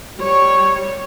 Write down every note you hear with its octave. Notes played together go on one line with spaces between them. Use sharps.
G3 C#5